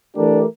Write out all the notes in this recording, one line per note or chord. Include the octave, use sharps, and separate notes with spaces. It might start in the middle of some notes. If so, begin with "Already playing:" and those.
E3 A3 D4 G4 A#4